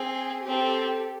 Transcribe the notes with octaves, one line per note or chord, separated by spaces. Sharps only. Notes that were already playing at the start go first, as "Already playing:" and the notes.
Already playing: C4 G#4
C4 G4 A4